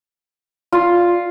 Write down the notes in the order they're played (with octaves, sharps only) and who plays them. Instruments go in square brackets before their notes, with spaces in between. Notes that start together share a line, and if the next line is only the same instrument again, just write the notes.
[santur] F4